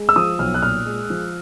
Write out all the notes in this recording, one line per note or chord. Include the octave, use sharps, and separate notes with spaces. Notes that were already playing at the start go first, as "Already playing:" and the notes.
Already playing: G#3
E6
F3 D#6
B1 F6
F#6
A#2 F6
G#3
F3